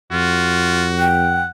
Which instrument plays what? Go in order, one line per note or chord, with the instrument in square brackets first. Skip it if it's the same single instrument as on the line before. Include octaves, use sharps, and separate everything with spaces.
[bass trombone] F2 [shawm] F4 [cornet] F#4
[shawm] F#5 [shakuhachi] G5